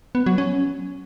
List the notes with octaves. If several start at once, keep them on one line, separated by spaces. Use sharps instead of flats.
B3
F#3
C#4